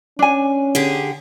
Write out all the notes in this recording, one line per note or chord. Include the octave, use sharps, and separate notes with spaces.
C#4 D4 G#5
D3 G4 G#4